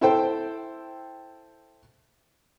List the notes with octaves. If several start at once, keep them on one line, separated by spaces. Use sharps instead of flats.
E4 A4 C5 G5